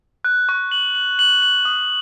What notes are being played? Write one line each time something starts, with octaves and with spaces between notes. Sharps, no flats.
F#6
C#6
F#7
F#7
F#7
F#7
D#6